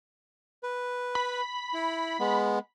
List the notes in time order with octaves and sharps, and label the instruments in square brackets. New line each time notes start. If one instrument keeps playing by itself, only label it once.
[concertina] B4
[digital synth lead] B5
[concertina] E4
G#3 B3